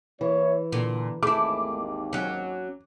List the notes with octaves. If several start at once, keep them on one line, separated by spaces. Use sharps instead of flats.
E3 A#3 E4 C#5
A#2 D3
G#1 D#2 A3 E4 G#4 D6
F#3 C#4